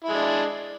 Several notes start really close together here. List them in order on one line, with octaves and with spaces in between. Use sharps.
E4 G#3 D4